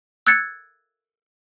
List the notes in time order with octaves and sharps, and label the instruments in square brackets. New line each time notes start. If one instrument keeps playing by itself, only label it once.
[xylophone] E6 F#6 G#6 A6 C#7